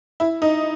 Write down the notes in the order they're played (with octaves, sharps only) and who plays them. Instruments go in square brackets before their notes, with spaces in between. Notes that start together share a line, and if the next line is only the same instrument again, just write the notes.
[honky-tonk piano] E4
D#4